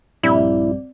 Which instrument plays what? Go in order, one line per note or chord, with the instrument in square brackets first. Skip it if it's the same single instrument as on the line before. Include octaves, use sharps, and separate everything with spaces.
[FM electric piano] A#1 G2 G3 [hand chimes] C4 D5 [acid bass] E4